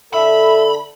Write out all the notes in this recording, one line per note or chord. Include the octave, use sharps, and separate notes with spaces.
D3 A4 E5 B5